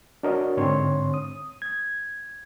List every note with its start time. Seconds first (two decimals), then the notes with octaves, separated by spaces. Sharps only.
0.23 D4 F#4 A#4 C#5 D#5
0.57 G#2 D3 C4 C#5 C6
1.14 D#6
1.62 G#6